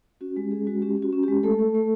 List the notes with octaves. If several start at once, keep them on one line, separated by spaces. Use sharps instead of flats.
C#4 F#4
G#3 G4
C#4 G#4
G#3 F#4
C#4 G4
C#4
F#4
C#4
G#3 G4
A3 A4
A3
A3